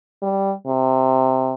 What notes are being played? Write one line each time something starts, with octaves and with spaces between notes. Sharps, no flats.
G3
C3